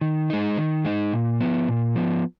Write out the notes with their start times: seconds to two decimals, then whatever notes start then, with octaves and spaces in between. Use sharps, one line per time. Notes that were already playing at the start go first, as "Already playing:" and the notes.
0.01 D#3
0.30 G#3 D#4
0.57 D#3
0.85 G#3 D#4
1.13 A#2
1.40 F3 B3
1.68 A#2
1.95 F3 B3